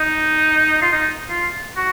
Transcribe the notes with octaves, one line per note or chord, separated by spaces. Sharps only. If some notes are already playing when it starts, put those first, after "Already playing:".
Already playing: D#4
F4
D#4
F4
F#4